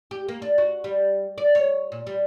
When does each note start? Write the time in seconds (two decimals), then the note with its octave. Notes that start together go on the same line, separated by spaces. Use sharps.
0.11 G4
0.29 A#3
0.42 D4
0.58 F#4
0.84 G3
1.38 D5
1.55 C#5
1.92 A#2
2.07 G3